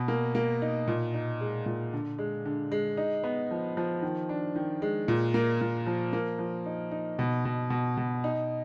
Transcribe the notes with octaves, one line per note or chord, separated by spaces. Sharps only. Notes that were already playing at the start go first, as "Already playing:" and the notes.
Already playing: B2
A#3
A#3
D#4
A#2
D#4
G#3
A#2
D3
G#3
D3
G#3
D#4
B3
F3
F3
D#3
D4
D#3
G#3
A#2
A#3
A#2
F3
A#3
F3
D#4
D#4
B2
B2
B2
B2
D#4